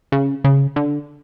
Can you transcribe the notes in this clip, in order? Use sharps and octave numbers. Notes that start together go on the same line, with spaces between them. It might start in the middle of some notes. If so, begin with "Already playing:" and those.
C#3
C#3
D3